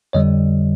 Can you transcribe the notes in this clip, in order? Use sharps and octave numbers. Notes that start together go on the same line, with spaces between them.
F2 D3 G3 C#5 D#5